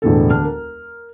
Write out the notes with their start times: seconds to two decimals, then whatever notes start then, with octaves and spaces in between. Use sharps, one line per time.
0.02 E1 A2 D3 A4
0.30 D2 D4 F6
0.45 A#4